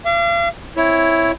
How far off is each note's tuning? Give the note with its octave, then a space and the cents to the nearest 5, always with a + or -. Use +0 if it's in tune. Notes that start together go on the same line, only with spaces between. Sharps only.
F5 -40 D6 +0
C4 +0 E4 +0 C#5 +0